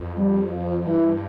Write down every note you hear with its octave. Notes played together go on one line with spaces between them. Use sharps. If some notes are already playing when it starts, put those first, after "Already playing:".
Already playing: F2
G3
F3
G2 E3